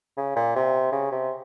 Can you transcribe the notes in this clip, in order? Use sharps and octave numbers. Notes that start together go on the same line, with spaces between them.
C#3
A#2
C3
C#3
C3